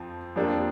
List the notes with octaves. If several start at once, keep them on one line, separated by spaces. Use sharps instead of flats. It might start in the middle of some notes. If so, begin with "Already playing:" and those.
Already playing: F2 F3 C4
F2 F3 A#3 D4 G4